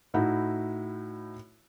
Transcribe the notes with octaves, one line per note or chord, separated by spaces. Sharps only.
A2 D#4 E4 F#4